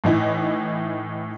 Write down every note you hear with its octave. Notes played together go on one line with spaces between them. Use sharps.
A2 E3 D#4 E4